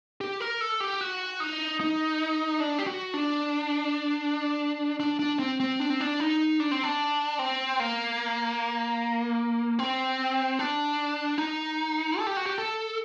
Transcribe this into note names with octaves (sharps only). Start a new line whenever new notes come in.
G4
A#4
A4
G4
F#4
D#4
D#4
D4
G4
F#4
D4
D4
D4
C4
C4
D4
C4
D4
D#4
D4
C4
D4
C4
A#3
C4
D4
D#4
A4
G4
F#4
G4
A4